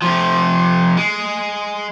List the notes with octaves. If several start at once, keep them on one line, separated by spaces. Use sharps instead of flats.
C3 F3
G#3